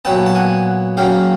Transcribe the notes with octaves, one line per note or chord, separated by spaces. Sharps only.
A#2 F#3 B3 G5 A5
A5
F#5 G#5
C#3 F#3 A#3 F5 G5